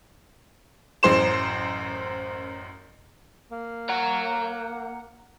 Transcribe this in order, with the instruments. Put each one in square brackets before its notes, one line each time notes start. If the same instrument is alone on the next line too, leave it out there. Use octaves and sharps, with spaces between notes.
[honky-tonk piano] A1 F#2 C5 C6 E7
[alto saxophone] A#3
[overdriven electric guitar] F#5 A#5